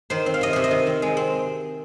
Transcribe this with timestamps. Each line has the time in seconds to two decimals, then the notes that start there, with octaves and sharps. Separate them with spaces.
0.10 D#3 C5
0.26 C4
0.34 F5
0.41 C3 D#5
0.53 C3 C5
0.64 D#5
0.71 D#3
0.87 C4
1.02 G#3
1.17 C4